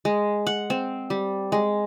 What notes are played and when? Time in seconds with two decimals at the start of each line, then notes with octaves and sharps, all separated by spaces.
0.05 G#3
0.47 F#5
0.70 C4
1.10 G3
1.52 G#3